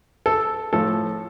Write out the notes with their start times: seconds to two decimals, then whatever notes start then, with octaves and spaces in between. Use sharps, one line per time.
0.26 A4
0.73 A2 F3 A4